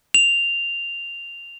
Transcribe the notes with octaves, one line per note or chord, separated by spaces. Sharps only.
F7